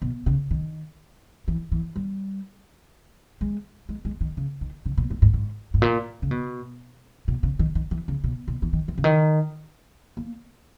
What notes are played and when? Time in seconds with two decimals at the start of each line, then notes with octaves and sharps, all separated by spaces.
0.02 B2
0.26 C#3
0.51 D#3
1.48 E3
1.72 E3
1.96 G3
3.41 G#3
3.89 G#3
4.05 G#3
4.21 D#3
4.37 C#3
4.61 D#3
4.86 C#3
4.98 A#2
5.10 G#2
5.22 G#2
5.34 G#2
5.74 G#2
5.82 A#2
6.22 C#3
6.31 B2
7.28 B2
7.43 C#3
7.59 D#3
7.75 D#3
7.91 E3
8.08 C#3
8.24 B2
8.48 B2
8.62 E3
8.73 D#3
8.88 E3
8.98 C#3
9.04 D#3
10.17 A#3